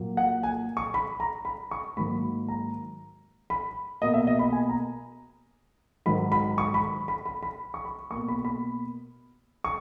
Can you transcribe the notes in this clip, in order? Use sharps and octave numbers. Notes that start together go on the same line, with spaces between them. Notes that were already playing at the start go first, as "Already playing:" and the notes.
Already playing: A#2 F#3 A#3
F#5
G#5
C#6
B5
A#5
B5
C#6
G#2 D#3 F#3 A#3 B5
A#5
B5
B2 A#3 D#5
E5
D#5
B5
G#5
A#5
G#2 D#3 F#3 B5
B5
C#6
B5
B5
B5
B5
C#6
B5
B2 A#3 C#6
B5
B5
C#6